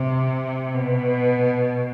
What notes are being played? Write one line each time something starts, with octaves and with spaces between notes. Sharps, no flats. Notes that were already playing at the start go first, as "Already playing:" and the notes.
Already playing: C3
B2